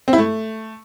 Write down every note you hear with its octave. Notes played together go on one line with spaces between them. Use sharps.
C4
E4
A3